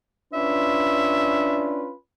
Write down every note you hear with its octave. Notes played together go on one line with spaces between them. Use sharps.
C#4 D4 F4 B4 E5